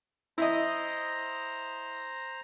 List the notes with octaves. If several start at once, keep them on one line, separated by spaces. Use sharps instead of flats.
E4 C5 D#5 A#5